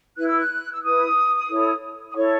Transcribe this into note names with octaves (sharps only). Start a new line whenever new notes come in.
E4 B4 F#6
E6
F#6
E6
E4 B4 D#6
E4 A4 C#5
D#6
E4 A4 C#5 C#6